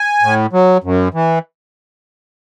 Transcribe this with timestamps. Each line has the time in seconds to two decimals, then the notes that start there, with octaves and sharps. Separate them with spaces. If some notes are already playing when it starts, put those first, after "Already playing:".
Already playing: G#5
0.22 A2
0.53 F#3
0.84 F#2
1.14 E3